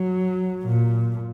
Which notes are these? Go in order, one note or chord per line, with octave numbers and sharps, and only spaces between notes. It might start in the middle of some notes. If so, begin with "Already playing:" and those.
Already playing: F#3
A#2